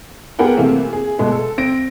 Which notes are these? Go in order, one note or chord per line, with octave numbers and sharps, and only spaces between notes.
B3 G4 G#4 A#4 F#5 G5
C3 E3 A3 A#3 C4
G#4
B2 G#3 A3
A4
C4 A#6 D7